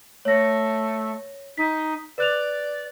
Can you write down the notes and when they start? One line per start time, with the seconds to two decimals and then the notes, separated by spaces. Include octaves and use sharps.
0.25 A3 C#5 A#6
1.58 D#4 B6
2.18 B4 D5 F#6 F7